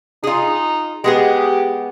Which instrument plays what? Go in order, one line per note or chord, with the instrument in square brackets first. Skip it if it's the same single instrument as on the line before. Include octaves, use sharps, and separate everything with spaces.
[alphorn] D#4 [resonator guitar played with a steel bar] F4 G#4
[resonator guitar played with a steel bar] G#3 B3 G#4 [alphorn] G4